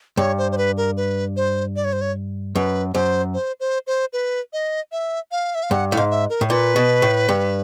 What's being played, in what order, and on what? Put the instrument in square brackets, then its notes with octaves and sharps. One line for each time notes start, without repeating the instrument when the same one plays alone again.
[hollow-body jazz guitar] G2 [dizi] C#5
[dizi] C5
C5
B4
A#4
B4
C5
D5
C#5
C5
C#5
[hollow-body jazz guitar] F#2 [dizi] B4
[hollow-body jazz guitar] F#2 [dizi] C5
[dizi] C5
C5
C5
B4
D#5
E5
F5
E5
F5
[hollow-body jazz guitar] G2 [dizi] F#5
[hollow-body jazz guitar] A2 [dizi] F5
[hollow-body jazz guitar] G#2
[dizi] E5
A#4
[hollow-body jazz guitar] A2
[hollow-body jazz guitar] A#2 [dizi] B4
[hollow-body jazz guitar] B2
A2
G2